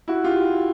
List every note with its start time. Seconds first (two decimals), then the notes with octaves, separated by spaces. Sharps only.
0.08 E4 F#4
0.24 F4 G4